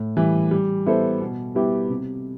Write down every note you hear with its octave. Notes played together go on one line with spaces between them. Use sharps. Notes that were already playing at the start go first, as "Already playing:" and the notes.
Already playing: A2
E3 G3
G3
B3 E4 A4 C5
B2
G3 B3 E4 G4
C3